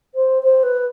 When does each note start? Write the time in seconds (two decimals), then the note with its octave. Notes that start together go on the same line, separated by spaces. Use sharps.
0.14 C5
0.42 C5
0.62 B4